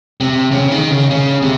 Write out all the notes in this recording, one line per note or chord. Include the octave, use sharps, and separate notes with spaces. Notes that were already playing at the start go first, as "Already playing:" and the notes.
C3
C#3
D#3
C#3
C#3
C3